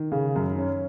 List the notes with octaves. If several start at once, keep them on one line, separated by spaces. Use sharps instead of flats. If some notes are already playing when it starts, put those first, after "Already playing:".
Already playing: D#3
C#3
F#2
C#4